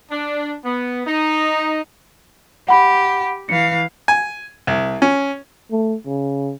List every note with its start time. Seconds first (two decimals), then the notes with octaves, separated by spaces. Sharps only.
0.11 D4
0.64 B3
1.07 D#4
2.69 G4 F#5 B5
3.49 E3 F5 C#7
4.08 G#5
4.67 C2
5.02 C#4
5.71 A3
6.06 C#3